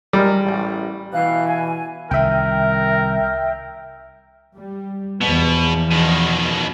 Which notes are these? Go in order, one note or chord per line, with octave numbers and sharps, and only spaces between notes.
G3 G#3 G#4 A#4
A1
B2 E3 F5 F#6
G#5
C2 D#3 A#4 E5 G5
G3
E2 B2 F3 B3
B2 D#3